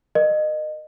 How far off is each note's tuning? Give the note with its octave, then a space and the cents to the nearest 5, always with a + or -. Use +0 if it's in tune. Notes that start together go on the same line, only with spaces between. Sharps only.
A#4 +20 D#5 -25